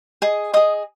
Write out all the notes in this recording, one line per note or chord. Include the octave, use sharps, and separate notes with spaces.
G#4 D#5
G#4 D#5 D#6